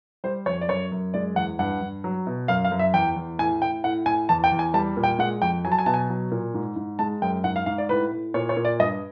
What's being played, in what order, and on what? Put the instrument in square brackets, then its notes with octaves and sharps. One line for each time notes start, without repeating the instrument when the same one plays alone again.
[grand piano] G3 C5
F2 C#5
D5
F#2 C#5
F#2
G#3 D5
E2 F#5
G2 F#5
G2
F#3
B2
F#2 F5
F5
F#2
E5
E2 G5
E2
A2 G#5
A2 G5
A2 F#5
A2 G#5
E2 A5
G5
E2
G#5
G3 A5
A#2
G5
G#3 F#5
F2 G5
F#3 G#5
A5
G#5
B2 A5
G#5
F#3
A#2
G#2
G#2
G#3 A5
F#2 G5
G#2 F#5
F5
G#2 F5
D5
A2 B4
A2
A#2 C#5
C#5
A#2
D5
G2 D#5